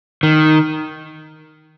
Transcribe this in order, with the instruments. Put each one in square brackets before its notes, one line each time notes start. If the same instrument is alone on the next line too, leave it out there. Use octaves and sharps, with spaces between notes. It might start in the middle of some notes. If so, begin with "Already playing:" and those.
[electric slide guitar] D#3